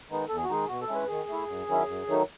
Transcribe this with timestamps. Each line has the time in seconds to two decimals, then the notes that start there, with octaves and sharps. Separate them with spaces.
0.10 D#3 G#3 B3 D#4
0.28 E2 A4
0.37 G#4
0.44 F#4
0.49 D#3 G#3 D#4 G#4
0.68 B2 F#4
0.82 A4
0.88 G#3 C#4 E4
0.95 B4
1.08 D#3 G#4
1.28 A3 E4
1.47 F#2
1.67 D#3 F#3 C#4 E4
1.87 F#2
2.07 D#3 F#3 A3 D#4